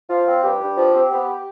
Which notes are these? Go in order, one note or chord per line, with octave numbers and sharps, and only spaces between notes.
F3 F4
C4
G2 G4
G2
F3
C4
B3